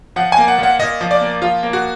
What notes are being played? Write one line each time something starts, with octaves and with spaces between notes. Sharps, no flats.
F3 F#5
G#5
A#3
F#5
A#2
F#5
A#2 D#5
F3
D5
A#3
F3 F4
A#3
F#4